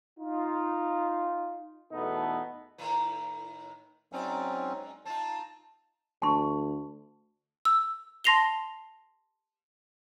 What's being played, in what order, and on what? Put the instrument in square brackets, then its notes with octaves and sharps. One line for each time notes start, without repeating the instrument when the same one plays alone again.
[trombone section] D#4 F4
E2 B2 A3 B3 D#4 A4
[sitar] A2 D#3 B4
[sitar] G#2 D#4 D5 [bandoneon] F#3 C4 C#4
[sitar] C4 D#4 F4 [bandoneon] A5
[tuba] D2 [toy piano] A5 C6 C#6
[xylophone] E6
A5 C6 A#6 C7 F7 G7